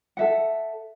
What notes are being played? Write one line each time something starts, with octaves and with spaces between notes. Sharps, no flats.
A4 E5 F#5